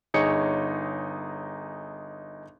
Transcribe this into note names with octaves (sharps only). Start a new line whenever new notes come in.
G1 D#4 G#4 C#5 D#5 C#7